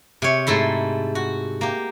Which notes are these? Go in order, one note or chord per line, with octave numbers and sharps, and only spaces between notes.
C3 C#5
G#2 A3 E4 C6
F#4
A#3 G4